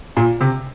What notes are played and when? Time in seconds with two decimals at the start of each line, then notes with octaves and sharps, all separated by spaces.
0.17 A#2
0.41 C3